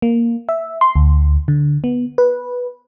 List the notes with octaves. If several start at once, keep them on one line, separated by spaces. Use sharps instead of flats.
A#3
E5
C6
D2
D3
B3
B4